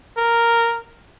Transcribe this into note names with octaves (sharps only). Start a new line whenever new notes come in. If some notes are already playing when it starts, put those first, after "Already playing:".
A#4